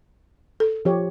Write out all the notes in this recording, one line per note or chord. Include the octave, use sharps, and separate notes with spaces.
A4
F3 G4 C#5